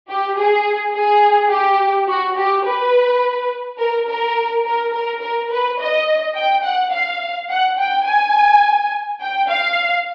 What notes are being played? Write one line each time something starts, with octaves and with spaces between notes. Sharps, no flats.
G4
G#4
G#4
G4
F#4
G4
B4
A#4
A#4
A#4
A#4
A#4
B4
D#5
G5
F#5
F5
F#5
G5
G#5
G5
F5